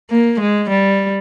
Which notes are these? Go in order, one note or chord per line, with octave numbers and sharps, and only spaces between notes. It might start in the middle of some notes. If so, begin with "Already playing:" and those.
A#3
G#3
G3